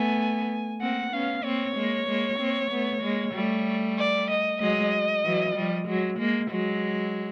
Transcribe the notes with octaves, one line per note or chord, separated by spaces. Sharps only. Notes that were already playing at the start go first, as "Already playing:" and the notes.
Already playing: A3 B3 G#5
A#3 C4 F#5
B3 C#4 F5
A#3 C4 C#5
G#3 A#3
G#3 A#3
A#3 C4
A3 B3
G#3 A#3
G3 A3
D5
D#5
F#3 G#3 D#5
E3 F#3
F3 G3
F#3 G#3
G#3 A#3
F#3 G#3